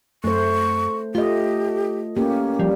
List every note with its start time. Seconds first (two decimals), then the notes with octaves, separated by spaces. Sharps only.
0.24 F#2 A3 C5 C#6
1.15 A3 F4 G4 D#5
2.17 A#3 C#4 G4
2.59 F3 G3